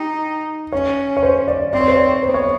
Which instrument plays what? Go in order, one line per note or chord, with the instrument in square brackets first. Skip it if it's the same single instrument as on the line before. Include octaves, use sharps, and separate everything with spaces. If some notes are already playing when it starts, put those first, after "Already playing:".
Already playing: [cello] D#4 [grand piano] G4
[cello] C#4 [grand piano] C#5
[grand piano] C#5
C5
D5
[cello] C4 [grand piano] D5
[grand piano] C#5
C5
C#5
[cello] B3 [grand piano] C5
[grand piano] C#5